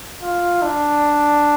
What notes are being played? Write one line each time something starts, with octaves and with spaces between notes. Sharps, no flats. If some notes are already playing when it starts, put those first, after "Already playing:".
F4
D4